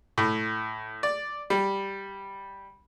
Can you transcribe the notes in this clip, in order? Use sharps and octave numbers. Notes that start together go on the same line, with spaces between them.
A2
D5
G3